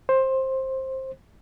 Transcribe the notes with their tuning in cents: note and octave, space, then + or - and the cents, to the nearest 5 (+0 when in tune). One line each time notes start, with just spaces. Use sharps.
C5 +15